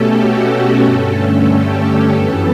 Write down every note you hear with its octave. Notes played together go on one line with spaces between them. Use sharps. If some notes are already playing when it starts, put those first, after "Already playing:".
Already playing: B2 A3 C#4 G4 A4
F#4
G4
G2 D3 A3 C#4 A4
G4
A4
F#2 E3 B3